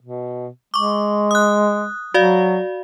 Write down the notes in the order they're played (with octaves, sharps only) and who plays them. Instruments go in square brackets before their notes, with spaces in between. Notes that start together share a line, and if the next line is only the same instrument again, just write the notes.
[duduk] B2
[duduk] G#3 [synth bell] C#6 D6
[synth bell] D#6 F#6
[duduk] F#3 [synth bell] F#4 D5 F5